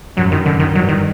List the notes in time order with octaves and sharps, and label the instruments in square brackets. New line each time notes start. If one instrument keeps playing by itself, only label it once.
[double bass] F#2 [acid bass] F#3
[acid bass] D#3
[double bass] F#2 [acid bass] D3
[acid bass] D#3
[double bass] G2 [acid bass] F#3
[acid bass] D#3